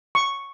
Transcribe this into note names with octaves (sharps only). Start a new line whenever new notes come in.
C#6